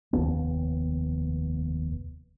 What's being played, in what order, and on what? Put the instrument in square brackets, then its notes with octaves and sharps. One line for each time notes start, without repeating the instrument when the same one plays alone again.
[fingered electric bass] F1 D#2 B3